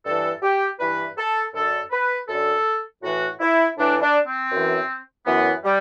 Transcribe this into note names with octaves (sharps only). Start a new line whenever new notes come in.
G2 E3 A4
G4
G2 E3 B4
A4
F#2 D3 A4
B4
F#2 D3 A4
A2 E3 F#4
E4
A2 E3 D4
D4
C4
F#2 E3
F#2 E3 B3
G3